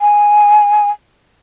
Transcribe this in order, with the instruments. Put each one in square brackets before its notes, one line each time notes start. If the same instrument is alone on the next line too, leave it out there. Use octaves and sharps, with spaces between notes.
[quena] G#5